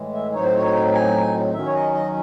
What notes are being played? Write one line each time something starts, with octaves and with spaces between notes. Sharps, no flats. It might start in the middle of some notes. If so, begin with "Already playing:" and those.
Already playing: A2 E3 G#3
E5
A2 F#3 C4 D#4 C#5
C5
C#5
G#5
D#3 F#3 C#4 E5
C#5
D#5
D#5